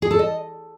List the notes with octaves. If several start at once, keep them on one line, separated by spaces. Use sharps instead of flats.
G#4
A4
D#5